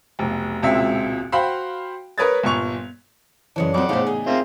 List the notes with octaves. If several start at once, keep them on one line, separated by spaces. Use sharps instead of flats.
F1 B1
E1 C#2 A#2 C4 E5
F#4 C5 F5 G5 B5
A#4 B4 C#5 D#6 G#6 A6
G1 A#2 C#6 F7
F#2 C#3 E3 G#3 C#4 D4
F2 F#3 C4 F#5 D6
E2 A2 C#3 D#4 G4 C5 C#5 F5
D#4 G#4
A#3 C4 F4 E5